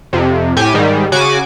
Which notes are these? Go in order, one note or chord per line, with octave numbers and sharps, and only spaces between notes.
F2 C3
A2 G4 G#5
G#2 D#3 G3
C#3 F#4 G#5 D6